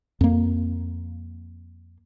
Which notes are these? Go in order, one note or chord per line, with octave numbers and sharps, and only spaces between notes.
F2 A#3